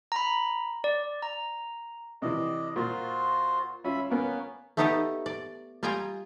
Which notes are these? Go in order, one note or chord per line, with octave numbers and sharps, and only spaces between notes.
A#5 B5
D5
A#5
C3 E3 D5 D#5
A#2 F4 F#4 C5
C#4 F4 E5 B5
A#3 B3 C#4 A#4
A3 B3 D#4 G4 A4 D#5
D5
G3 F4 D#5 G5 G#5 A#5